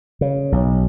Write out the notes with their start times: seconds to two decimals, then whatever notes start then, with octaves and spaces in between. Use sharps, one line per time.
0.21 C#3
0.52 B1